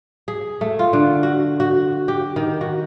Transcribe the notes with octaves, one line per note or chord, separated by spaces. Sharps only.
G#4
A3
F4
D3
F#4
F#4
G4
D#3
F#4